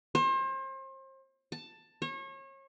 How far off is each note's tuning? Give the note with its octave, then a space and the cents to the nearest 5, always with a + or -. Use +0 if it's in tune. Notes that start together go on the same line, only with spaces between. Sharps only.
C5 +35
A5 +10
C#5 -35